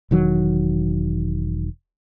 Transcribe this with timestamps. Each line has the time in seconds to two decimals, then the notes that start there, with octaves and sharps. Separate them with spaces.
0.11 E1 D#3 F#3